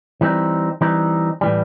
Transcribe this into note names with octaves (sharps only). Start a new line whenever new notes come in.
E3 G3 C4 D#4
E3 G3 C4 D#4
A2 E3 G3